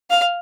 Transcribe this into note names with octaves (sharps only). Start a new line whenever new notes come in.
F5